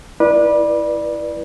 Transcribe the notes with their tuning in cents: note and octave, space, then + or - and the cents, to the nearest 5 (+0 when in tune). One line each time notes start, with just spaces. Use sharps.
E4 +0 B4 -25 D5 +15